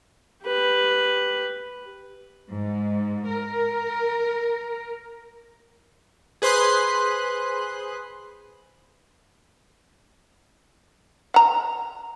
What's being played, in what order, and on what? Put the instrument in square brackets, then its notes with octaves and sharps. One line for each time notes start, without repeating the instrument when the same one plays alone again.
[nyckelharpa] G4 B4
[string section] G#2
A#4
[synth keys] G#4 B4 C5 C6 D#6 F#6
[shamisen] F#5 A#5